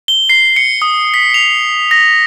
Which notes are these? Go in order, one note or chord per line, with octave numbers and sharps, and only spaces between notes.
G7
C7
C#7
D#6
B6
F7
A#6